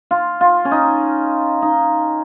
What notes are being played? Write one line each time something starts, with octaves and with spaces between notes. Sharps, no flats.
F4
F4
C#4
D#4
D#4